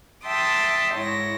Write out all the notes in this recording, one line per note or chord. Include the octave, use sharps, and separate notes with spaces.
E5 G5 A5 C6 D6 D#6
G#2 E4 C#5 A#6